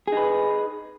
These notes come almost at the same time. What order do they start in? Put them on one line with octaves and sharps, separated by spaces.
G#4 D#4 B4